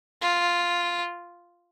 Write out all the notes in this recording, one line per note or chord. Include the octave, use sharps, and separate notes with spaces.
F4